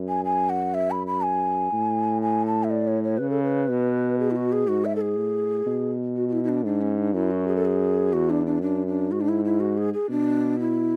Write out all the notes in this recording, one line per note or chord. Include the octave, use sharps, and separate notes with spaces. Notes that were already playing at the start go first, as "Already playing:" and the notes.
Already playing: F#2
G#5
G#5
F#5
E5
B5
B5
G#5
A2
G#5
A5
E5
D5
C#5
C#5
C#3 B4
A4
B4
B2
G#4
E4
F#4
G#4
G#2 F#4
E5
A4
G#4
A2
B2
F#4
F#4
E4
E4
D4
G#2 D4
C#4
D4
F#2 E4
F#4
G#4
A4
G#4
E2 F#4
D4
D4
F#2 D4
D4
G#2 F#4
D4
E4
E4
F#4
G#4
G#4
B2 D4
E4